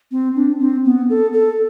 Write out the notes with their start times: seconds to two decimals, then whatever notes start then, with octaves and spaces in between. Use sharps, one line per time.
0.11 C4
0.35 D4
0.59 C4
0.84 B3
1.09 A4
1.33 A4